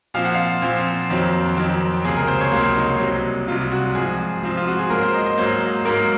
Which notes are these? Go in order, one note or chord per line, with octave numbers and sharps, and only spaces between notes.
A#2 F3 C4 F5
F#5
F5
A#2 F3 C4
F2 D#3 F#3 C4
F2 D#3 F#3 C4
C#2 C3 F#3 A#3 G#4
A#4
C5
C#5
C#2 C3 F#3 A#3 A#4
D#4
C2 C3 F#3
C2 C3 F#3 F4
F#4
G#2 F3 C4 G#4
G#2 F3 C4
F4
F#4
G#4
G#2 F#3 A#3 A#4
C5
D#5
D#5
G#2 F#3 A#3 C5
G#2 F#3 A#3 A#4